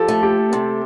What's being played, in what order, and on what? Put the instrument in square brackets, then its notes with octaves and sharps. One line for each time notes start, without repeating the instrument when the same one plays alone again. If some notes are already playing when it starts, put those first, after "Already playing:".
Already playing: [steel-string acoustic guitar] F3 [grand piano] G4 A4
[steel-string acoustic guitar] A3
[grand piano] G4
[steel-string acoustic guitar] C3